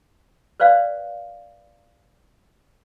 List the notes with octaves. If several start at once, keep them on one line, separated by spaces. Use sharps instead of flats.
B4 C5 D5 F5